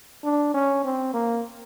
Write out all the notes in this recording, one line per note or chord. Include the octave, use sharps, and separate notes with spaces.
D4
C#4
C4
A#3